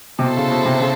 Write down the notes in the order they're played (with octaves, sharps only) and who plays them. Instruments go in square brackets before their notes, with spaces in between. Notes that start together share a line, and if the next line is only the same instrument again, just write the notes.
[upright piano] C3
[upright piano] B2 [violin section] E4 A4 C5
[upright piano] C#3
B2
C3
C#3